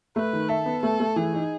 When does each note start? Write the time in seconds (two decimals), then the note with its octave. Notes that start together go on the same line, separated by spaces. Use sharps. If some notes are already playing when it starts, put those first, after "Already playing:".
0.16 A3 B4
0.33 D#3
0.49 A4 E5
0.66 B3
0.83 A3 A4
1.00 A3
1.16 E3 G#4
1.33 D#4